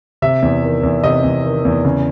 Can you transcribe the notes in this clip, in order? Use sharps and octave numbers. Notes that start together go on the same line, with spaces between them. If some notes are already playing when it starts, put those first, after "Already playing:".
C3 E5
E2
D#3
E2
C3 D#5
E2
D#3
E2
C#3